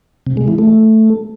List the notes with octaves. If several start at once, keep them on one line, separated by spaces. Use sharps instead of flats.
C3
G#3
E3
A3